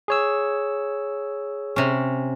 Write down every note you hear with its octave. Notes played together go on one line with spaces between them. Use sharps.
G#4 C#5 E6
C3 C#4